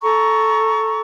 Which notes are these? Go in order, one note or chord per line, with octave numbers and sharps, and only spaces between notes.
A4 A#5 C#6